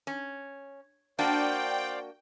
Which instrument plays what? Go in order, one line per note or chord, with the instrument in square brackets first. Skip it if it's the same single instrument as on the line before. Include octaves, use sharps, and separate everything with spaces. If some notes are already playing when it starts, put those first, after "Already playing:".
[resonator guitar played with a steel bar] C#4
[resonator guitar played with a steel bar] A#3 D4 F#4 [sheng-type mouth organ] C5 D5 F5 [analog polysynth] G5